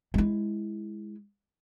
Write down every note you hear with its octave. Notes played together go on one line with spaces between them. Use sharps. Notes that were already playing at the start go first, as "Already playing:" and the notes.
G#3 E4